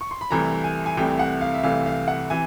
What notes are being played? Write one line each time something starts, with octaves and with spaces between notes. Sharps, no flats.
C#6
C6
B5
C2 C3 E3 A3 A#5
G#5
G#5
C2 C3 E3 A3 G5
F#5
F5
E5
C2 C3 E3 A3 F5
F5
F#5
C3 E3 G#5